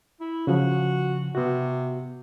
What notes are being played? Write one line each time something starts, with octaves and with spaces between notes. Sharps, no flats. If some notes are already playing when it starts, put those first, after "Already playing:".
E4
C#3 F3 F#4
C3 B3 F#4